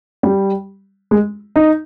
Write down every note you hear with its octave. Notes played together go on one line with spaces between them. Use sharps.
G3
G#3
D#4